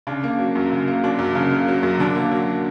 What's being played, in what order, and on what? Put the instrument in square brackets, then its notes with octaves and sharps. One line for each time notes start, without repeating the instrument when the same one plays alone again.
[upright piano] C#3 D4
A#3
F#3
F#2
C#3
A#3
F#3 D4
F#2
C#3
A#3
F#3
F#2
D3 D4
A#3
F#3